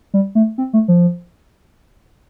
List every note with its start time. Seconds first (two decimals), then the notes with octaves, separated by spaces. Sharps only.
0.14 G3
0.35 A3
0.58 C4
0.73 A3
0.88 F3